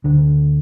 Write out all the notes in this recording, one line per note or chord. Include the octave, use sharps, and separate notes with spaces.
D2 D3